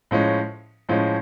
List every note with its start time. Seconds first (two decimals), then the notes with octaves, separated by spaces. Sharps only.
0.11 A2 F3 G#3 C#4
0.89 A2 F3 G#3 C#4